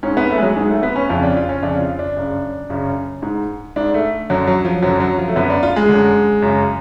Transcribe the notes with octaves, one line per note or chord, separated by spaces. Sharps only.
G#2 C#4
B3
A3
G#3
F#3
G#2 G#3
A3
B3
C#4
F2 C#3 F4
D4
F4
C#4
F2 C#3 D4
F4
D4
F#2 C#3
F#2 C#3
G#2
G#2 D4
A3
F#2 D3 F#3
F#3
F3
F#2 D3 F#3
F#3
F3
A3
F#2 D3 B3
D4
F4
G#3
F#2 D3
F#2 C#3